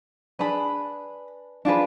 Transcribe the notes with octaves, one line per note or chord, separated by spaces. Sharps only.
D4 G#4 B4 B5
D4 F4 G#4 B4